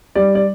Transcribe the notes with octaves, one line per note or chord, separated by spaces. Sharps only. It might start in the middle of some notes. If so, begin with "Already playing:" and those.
G3 D5
D5